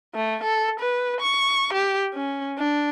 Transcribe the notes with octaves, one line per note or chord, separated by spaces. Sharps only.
A3
A4
B4
C#6
G4
C#4
D4